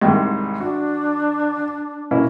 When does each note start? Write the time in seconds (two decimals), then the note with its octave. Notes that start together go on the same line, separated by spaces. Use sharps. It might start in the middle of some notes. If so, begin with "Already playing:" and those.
0.01 C2 G#2 D#3
0.60 D4 F#4
2.11 B2 A#3 C#4 E4